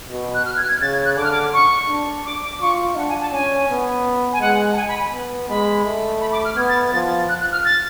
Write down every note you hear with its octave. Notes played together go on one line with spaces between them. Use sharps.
B2
F#6
F6
G#6
F#6
G#6
C#3 A6
G#6
F#6
D3 D6
F6
D6
C#6
D4
D6
D6
F4 C#6
D4 F#5
G#5
A5
C#4 G#5
B3
G#5
G#3 F#5
A5
G#5
B5
B3
G#3 B5
A3
B5
D6
F6
B3 G#6
A6
F3 A6
F#6
F#6
F6
A6